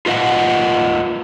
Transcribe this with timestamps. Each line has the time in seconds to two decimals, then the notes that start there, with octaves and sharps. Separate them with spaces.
0.06 F4 B4 D#5 F5 F#5